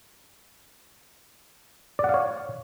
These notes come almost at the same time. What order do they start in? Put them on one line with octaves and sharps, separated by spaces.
D5 F#5 F5 C#5